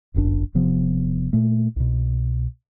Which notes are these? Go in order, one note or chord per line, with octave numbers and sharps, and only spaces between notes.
D1 G1 F#2 D4
E1 C3 F3 B3
A#2 A3
C2 B2